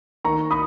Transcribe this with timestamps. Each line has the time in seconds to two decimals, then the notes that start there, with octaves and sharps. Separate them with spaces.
0.25 D#3 A#3 A#5 C#6
0.51 B5 D#6